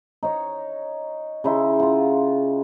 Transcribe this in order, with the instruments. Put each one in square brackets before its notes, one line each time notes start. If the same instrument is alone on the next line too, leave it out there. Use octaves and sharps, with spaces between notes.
[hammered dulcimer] D#4 C#5
C#3 D#4 E4 C6
F4 F#5